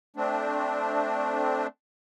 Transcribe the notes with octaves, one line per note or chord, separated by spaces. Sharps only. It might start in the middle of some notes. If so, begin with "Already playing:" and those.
A3 C4 D4